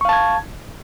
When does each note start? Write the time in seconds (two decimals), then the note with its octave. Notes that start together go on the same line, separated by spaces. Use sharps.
0.01 C#6
0.05 F5
0.09 A5
0.13 G#6